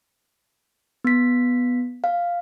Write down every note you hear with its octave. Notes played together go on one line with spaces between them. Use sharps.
B3 B6
F5